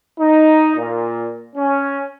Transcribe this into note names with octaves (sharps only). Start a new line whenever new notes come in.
D#4
A#2
C#4